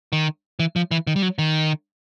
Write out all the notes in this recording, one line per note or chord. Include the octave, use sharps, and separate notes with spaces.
D#3
E3
F3
E3
D#3
G3
F#3
D#3